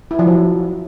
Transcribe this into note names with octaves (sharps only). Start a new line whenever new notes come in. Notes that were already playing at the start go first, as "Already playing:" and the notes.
E4
F3
F#3